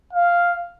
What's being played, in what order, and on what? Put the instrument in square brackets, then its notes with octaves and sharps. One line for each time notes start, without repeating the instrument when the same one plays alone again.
[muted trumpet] F5